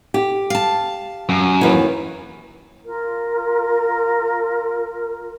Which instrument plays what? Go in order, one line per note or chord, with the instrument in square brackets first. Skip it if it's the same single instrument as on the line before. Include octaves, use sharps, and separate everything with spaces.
[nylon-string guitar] G4
[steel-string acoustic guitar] F5 A5
[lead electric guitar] F#2
[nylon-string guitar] D#2 E3
[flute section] F4 A#4